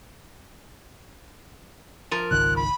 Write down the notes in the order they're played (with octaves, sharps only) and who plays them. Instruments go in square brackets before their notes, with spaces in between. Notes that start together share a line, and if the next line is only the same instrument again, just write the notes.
[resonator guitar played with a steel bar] F3 A#4
[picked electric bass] G#1 C#2 D#3 [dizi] F#6
[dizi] B5